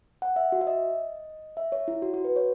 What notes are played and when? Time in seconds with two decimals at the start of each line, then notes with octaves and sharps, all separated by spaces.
0.22 F#5
0.36 E5
0.52 F#4
0.61 E5
0.67 D#5
1.57 E5
1.72 C#5
1.88 E4
2.02 F#4
2.14 F#4
2.25 B4
2.36 C#5